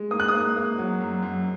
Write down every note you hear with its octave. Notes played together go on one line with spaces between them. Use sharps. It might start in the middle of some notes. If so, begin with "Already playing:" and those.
Already playing: G#3
A#3 D#6
F#6
D#6
A#3
A#3
F#3
F#2
F#2